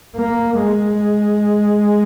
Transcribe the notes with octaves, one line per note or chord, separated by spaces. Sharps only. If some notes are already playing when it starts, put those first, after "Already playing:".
A#3
G#3